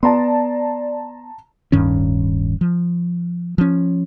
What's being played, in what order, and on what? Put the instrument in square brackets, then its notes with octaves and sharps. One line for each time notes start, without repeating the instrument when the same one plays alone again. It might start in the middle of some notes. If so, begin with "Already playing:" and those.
[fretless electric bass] B3 [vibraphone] D5 [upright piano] A5 A#5 C6
[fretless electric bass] D1 G2 D#3 C#4
F3
F3 C#4